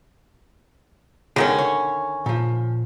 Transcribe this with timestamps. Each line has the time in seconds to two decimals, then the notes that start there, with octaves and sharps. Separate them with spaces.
1.36 C#2 B2 D3 D#3 C#4 G#4
1.58 C#5
2.26 A#2 F3